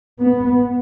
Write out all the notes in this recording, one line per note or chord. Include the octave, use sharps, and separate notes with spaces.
B3